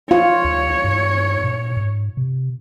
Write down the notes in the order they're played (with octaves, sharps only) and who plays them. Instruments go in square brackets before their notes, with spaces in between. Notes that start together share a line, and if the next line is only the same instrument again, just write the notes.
[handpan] F4 [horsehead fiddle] C#5
[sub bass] D2
G2
A#2
G#2
C3